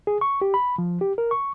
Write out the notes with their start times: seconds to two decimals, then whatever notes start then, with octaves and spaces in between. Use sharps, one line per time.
0.07 G#4
0.21 C#6
0.41 G4
0.54 B5
0.78 F3
1.01 G4
1.18 A#4
1.31 C#6